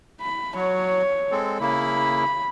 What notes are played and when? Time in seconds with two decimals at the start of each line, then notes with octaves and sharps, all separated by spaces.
0.21 B5
0.56 F#3 C#5
1.31 G#3 C4 A4
1.61 C#3 A#3 E4 B5